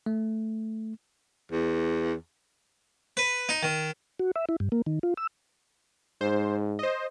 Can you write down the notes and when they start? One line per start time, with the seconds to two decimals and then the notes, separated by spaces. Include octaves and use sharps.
0.06 A3
1.52 E2
3.17 B4
3.49 D#4
3.63 D#3
4.20 F#4
4.36 E5
4.49 E4
4.60 G2
4.72 A#3
4.86 D#3
5.03 F4
5.17 E6
6.21 G#2 C5
6.79 C5 D#5